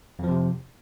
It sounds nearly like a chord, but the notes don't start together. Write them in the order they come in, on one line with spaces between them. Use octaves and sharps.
F2 F3 C3